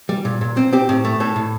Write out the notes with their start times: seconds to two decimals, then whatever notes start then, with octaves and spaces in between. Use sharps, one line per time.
0.09 G3
0.25 A#2
0.41 A#2
0.57 C4
0.73 C4 G4
0.89 A2
1.05 A3
1.20 A2 A4
1.36 A2